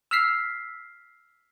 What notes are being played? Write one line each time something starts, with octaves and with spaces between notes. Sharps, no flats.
E6 F6 B6 C7